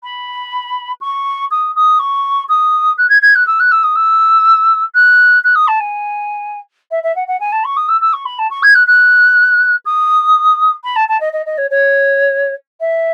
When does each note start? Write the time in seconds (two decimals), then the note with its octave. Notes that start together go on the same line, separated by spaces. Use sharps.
0.03 B5
1.01 C#6
1.51 D#6
1.75 D#6
1.99 C#6
2.49 D#6
2.98 F#6
3.09 G#6
3.22 G#6
3.35 F#6
3.47 E6
3.60 F#6
3.71 E6
3.83 D#6
3.95 E6
4.94 F#6
5.44 F#6
5.55 D#6
5.67 A5
5.80 G#5
6.91 E5
7.03 E5
7.15 F#5
7.27 F#5
7.40 G#5
7.52 A5
7.64 C#6
7.76 D#6
7.88 E6
8.01 E6
8.13 C#6
8.25 B5
8.38 A5
8.50 C#6
8.63 G#6
8.74 F#6
8.87 F#6
9.85 D#6
10.84 B5
10.96 A5
11.08 A5
11.20 D#5
11.32 D#5
11.46 D#5
11.57 C#5
11.70 C#5
12.80 E5